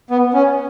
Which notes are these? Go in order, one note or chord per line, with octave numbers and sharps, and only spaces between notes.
B3
C#4